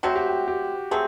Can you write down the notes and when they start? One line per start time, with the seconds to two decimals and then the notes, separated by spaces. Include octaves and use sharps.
0.03 F#3 A3 C4 F#4
0.16 G4
0.29 F#4
0.48 G4
0.91 F#3 A3 C4 G#4